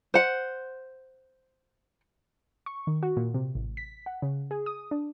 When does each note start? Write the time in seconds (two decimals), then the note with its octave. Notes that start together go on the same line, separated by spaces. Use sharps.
0.14 C5 F#5
2.66 C#6
2.87 D#3
3.03 F#4
3.17 A#2
3.34 C3
3.55 A1
3.77 B6
4.06 F#5
4.22 C#3
4.51 G#4
4.66 D#6
4.91 D4